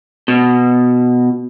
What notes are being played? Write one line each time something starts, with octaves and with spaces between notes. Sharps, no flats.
B2